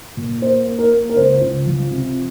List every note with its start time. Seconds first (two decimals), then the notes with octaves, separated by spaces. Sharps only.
0.17 A#2
0.42 A#3 C5
0.67 A#3
0.79 A#4
0.92 A#3
1.10 A#4
1.16 C#2 C5
1.41 C#2
1.67 F3
1.91 C3